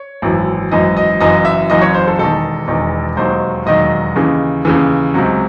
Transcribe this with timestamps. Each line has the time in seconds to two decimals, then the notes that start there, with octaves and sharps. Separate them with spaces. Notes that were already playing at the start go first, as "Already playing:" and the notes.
Already playing: C#5
0.22 G#1 F#2 E3
0.71 G#1 F#2 E3 D#5
0.97 D#5
1.20 F#1 F#2 E3 D#5
1.45 E5
1.70 F#1 F#2 E3 D#5
1.81 C#5
1.94 C5
2.07 A4
2.19 E1 E2 D#3 A4
2.68 E1 E2 D#3
3.17 E1 D#2 D#3 F#3 C5
3.66 E1 D#2 D#3 F#3 D#5
4.16 D#2 C#3 E3
4.65 D#2 C#3 E3
5.14 C#2 C3 F#3